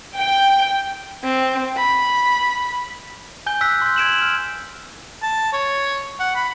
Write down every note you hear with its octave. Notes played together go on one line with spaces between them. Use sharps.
G5
C4
B5
G#5 G6 G7
E6 F#6 G6 B6
C6 G6
G#6 D7 E7 F#7
F6
A5
C#5
F#5
B5